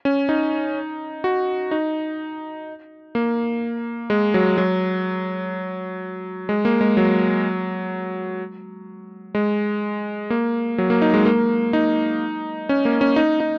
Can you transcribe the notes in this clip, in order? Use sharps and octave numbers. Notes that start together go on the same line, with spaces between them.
C#4
D#4
F#4
D#4
A#3
G#3
F#3
F#3
G#3
A#3
G#3
F#3
G#3
A#3
F#3
A#3
D#4
G#3
A#3
D#4
C#4
A#3
C#4
D#4
D#4